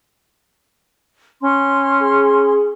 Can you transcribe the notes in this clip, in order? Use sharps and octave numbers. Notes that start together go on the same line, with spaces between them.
C#4 C6
G#4